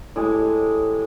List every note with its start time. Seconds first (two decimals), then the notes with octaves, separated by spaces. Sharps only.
0.16 A2 G#3 G4